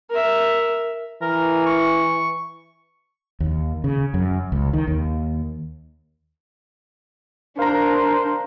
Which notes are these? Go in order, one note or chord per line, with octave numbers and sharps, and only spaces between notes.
A#4 E5
E3 A#4
C#6
D#2
C#3
F#2
C#2
D#3
D#2
D4 A#4 C5 F5 A#5